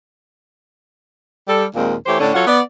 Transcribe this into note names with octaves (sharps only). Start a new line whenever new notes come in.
G3 A4
D#2 A#2 D#3 G#3 C4
E3 A3 G4 C5 C#5
A2 D3 C#4 D4
F#3 F4 A4 C#5 F#5
B3 D5